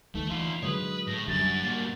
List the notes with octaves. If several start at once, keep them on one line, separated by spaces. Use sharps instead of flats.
D2 D#3 E3 A3
E3 D#4 F4 C6
D3 F#3 G#3 B4 C#5 D#6
A2 A#6
F#2 A2 D3 G3 A6
A#3 F#4